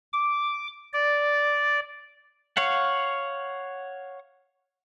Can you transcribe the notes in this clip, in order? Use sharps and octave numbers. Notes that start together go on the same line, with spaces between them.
D6
D5
C#5 F5 F#5